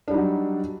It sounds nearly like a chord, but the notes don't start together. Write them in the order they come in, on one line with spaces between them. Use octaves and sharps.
D4 G3 D#4 F#3